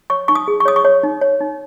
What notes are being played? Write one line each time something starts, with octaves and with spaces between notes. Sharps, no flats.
C#5 C#6
D#4 C#6
D#6
G#4
C#6
C#5 D#6
C#6
C#5
D#4
C#5
D#4